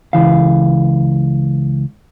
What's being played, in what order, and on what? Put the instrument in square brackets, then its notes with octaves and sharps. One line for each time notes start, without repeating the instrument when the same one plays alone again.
[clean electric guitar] C#2 E3 F5